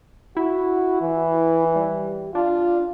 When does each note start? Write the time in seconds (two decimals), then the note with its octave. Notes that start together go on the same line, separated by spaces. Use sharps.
0.37 E4 F#4
1.01 E3
1.76 G3
2.35 D4 F4